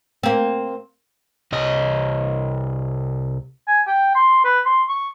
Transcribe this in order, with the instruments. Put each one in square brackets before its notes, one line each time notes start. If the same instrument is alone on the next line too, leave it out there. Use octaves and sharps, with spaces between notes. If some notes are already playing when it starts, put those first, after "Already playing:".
[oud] A#3 C4
[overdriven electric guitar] C2 D#5
[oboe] G#5
G5
C6
B4
C6
C#6